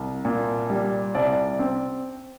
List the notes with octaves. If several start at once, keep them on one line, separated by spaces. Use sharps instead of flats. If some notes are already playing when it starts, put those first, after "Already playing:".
Already playing: C2
A#2
G3
C2 D5
C4